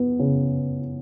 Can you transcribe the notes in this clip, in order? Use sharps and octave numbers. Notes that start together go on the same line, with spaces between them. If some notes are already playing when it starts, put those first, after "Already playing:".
Already playing: B3
C#3